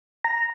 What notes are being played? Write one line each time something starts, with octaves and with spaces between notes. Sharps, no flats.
A#5